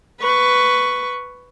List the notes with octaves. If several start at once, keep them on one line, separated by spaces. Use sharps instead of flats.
B4 C#6